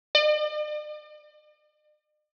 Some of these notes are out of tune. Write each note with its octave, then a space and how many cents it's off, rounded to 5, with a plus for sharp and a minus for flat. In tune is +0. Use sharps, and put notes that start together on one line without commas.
D5 +45